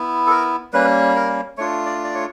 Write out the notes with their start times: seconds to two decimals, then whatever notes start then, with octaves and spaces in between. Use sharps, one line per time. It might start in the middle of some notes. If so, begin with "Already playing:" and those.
Already playing: B3 E4
0.27 A4
0.31 A#4
0.73 G3 A#3 C#4 B4
1.16 A#4
1.58 A3 D4 F4 C#5
1.86 D5
2.04 D5
2.15 C#5